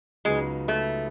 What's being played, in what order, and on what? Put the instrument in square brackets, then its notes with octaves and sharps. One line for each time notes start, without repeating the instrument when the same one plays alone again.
[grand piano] C#2 C#3 F#3 B3 D#4 [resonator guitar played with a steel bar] G#3
[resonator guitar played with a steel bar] A3